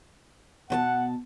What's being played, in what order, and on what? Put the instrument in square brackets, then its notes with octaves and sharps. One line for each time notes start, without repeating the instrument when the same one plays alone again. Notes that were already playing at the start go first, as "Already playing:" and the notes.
[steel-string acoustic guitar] B2 C5 A5 [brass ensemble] F#5